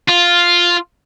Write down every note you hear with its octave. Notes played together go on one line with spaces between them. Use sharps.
F4